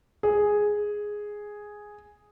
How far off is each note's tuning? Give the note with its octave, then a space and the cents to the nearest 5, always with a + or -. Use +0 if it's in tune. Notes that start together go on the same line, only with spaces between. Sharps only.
G#4 +0